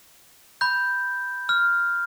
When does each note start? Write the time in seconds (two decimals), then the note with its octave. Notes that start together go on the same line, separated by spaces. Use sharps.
0.61 B5 G6
1.49 F6